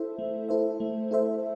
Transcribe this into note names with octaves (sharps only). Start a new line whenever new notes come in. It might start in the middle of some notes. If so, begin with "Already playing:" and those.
Already playing: E4 A4 C5 E5
A3
E4 A4 C5 E5
A3
E4 A4 C5 E5